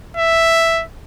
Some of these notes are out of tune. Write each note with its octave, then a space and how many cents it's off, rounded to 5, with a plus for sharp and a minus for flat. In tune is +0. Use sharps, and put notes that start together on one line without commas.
E5 +0